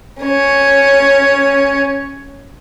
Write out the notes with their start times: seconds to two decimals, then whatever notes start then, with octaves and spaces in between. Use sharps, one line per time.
0.23 C#4 C#5